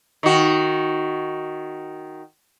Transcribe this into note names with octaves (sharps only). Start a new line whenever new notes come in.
D#3 F#4